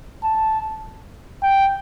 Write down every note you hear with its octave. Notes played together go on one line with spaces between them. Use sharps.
A5
G5